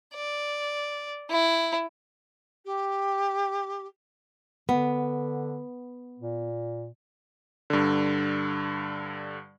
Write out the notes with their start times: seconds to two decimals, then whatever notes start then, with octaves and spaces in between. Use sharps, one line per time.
0.15 D5
1.30 E4
2.65 G4
4.69 D3 B3
6.19 A#2
7.70 G2 D3